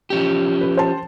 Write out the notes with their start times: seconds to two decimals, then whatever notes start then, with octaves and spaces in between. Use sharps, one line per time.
0.10 F3 C#4 G4
0.61 B4
0.77 C5 A5